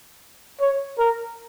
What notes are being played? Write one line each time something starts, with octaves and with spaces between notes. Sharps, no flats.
C#5
A#4